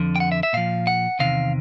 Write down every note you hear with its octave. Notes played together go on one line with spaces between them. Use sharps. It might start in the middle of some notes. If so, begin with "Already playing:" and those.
Already playing: F2 D3 F3
G5
F#5
E5
E5
A#2 F3 F5
F#5
E2 C3 D#3 F5